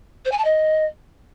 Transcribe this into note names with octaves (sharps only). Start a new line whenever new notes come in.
C5
G#5
A5
D#5